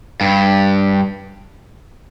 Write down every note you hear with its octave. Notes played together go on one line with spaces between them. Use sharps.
G2